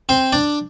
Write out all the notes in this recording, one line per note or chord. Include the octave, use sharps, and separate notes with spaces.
C4 C5
D4 D5